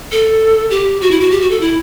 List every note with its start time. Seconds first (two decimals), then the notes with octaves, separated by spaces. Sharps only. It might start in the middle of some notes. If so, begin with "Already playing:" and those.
0.12 A4
0.70 G4
1.01 F#4
1.11 E4
1.20 F#4
1.31 G4
1.41 F#4
1.51 A4
1.61 E4